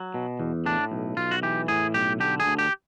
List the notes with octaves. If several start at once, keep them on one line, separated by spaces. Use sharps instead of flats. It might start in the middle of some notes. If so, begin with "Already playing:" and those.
Already playing: F#3
B2
E2
A2 D4
B1
B1 F4
F#4
E3 G4
A2 G#4
B1 G4
D3 G4
G#4
D2
G4